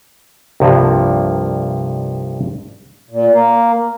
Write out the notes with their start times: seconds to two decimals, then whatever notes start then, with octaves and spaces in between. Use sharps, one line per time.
0.60 C2 G2 F3 A#3
3.11 A#2
3.33 A#3